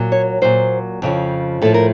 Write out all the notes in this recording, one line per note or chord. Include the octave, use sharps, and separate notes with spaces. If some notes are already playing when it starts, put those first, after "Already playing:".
Already playing: A#2 F#3
C#5
A#2 F#3 C5
F2 C#3 F3
A2 F3 A4
A#4